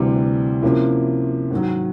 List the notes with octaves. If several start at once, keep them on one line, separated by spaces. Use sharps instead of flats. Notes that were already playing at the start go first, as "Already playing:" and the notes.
Already playing: D2 C3 E3 G3
C3 F3 A#3 C#4 E4
G#2 D#3 F#3